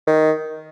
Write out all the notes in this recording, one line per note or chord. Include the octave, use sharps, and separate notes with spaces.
D#3